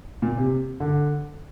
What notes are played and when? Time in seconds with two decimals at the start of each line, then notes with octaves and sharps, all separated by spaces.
0.22 A#2
0.37 C3
0.80 D3